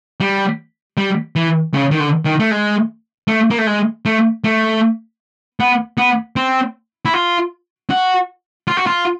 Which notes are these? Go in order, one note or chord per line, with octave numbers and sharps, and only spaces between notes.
G3
G3
E3
C#3
D#3
D3
D#3
A3
G#3
A3
A#3
A3
G#3
A3
A3
B3
B3
C4
E4
F4
F#4
F4
F#4
F4